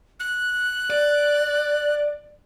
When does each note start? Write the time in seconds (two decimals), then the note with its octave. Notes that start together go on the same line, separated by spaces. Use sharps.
0.20 F#6
0.90 D5